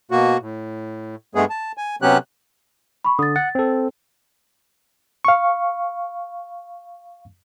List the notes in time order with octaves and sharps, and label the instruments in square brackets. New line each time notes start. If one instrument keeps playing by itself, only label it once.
[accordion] B2 A#3 F#4
A2
G2 G#3 A3 B3 G#4
A5
G#5
C3 F#3 B3 C#4 G4 F#6
[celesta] B5 C#6
[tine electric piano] D3 [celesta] D#6 A6
[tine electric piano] F#5 [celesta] A6
[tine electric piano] C4 A4
[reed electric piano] F5 C#6